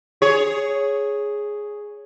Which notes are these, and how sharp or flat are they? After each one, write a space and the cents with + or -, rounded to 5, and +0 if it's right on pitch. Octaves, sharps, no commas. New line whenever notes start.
G#4 +0 C#5 +0